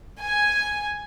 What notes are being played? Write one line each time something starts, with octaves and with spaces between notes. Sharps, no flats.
G#5